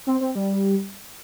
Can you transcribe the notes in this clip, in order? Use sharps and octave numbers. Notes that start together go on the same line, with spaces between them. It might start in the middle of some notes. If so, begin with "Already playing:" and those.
C4
C4
G3